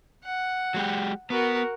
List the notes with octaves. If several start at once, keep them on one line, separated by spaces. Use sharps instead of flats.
F#5
F#3 G#3 G4
B3 F#4 A#4